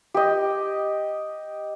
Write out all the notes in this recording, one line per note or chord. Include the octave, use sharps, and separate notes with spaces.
G4 D#5